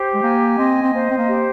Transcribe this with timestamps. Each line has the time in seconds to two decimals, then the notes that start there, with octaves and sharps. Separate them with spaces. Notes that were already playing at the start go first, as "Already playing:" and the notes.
Already playing: G4 C5
0.14 G#3
0.23 A#3 G#5
0.58 C4 D#5
0.82 C4
0.93 A#3 C5
1.10 C4
1.18 A#3
1.29 G4